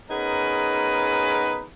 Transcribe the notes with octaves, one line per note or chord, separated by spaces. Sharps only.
B3 C#4 D#4 G#4 A#4 B4